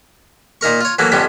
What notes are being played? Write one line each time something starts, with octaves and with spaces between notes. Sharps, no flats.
A#2 D#4 A#4 C#6
F4 C#5
E3 F#3 A3 A#3
F2 A2 G3 B3 C#4